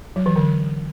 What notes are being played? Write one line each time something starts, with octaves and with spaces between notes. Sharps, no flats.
F#3
E3
D3